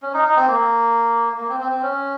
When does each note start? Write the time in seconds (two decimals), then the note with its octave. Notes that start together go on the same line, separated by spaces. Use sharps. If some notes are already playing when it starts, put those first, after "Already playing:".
0.02 C#4
0.14 D#4
0.25 D#4
0.36 C4
0.48 A#3
1.38 A#3
1.49 C4
1.60 C4
1.72 C4
1.83 C#4